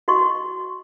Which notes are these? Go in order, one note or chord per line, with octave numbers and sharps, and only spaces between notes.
F#4 D#5 C6 C#6